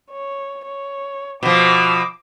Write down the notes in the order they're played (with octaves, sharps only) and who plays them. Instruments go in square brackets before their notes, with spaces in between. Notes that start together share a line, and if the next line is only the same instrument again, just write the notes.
[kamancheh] C#5
C#5
[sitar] B2 F3 [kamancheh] D6